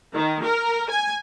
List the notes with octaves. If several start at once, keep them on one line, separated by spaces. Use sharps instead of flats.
D#3
A#4
G#5